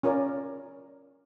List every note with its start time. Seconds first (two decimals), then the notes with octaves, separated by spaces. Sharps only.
0.03 C#4 F4 A#4 C#5 D5